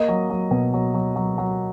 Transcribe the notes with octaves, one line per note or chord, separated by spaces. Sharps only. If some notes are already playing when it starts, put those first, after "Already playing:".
Already playing: A#3 D#5
F#3
F#3
B2
F#3
F#3
F#3
F#3